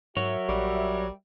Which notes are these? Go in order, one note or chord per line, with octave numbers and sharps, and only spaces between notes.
G#2 F#3 F#4 A#4 C#5 E5
A#1 G3